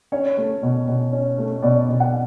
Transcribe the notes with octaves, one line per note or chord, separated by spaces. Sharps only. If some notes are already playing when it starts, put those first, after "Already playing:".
C#4 C#5
A3
B2
B2
C#4
A3
B2 D5
B2
F#5